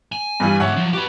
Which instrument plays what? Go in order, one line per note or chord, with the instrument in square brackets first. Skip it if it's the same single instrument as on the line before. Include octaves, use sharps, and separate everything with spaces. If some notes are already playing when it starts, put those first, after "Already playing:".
[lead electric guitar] G#5
[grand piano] G2 E3 G3
[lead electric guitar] G#2 D3 [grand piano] C#5 E5 F#5
[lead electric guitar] F3 F#3
[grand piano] F#4 [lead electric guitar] G4 B4